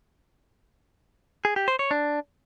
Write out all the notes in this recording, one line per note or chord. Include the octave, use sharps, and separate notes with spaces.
G#4
G4
C5
C#5
D4